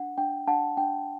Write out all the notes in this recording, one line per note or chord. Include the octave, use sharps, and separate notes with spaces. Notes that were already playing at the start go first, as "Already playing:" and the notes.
Already playing: D4 F#5
D4 G5
D4 F#5 A5
D4 G5